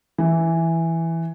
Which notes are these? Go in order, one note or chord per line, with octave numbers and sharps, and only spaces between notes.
E3